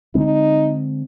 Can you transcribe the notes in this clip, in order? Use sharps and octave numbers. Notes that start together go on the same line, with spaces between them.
D3 G#3 C4 D#4